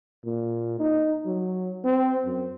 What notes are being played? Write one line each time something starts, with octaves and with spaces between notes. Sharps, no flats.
A#2
D#4
F#3
C4
F#2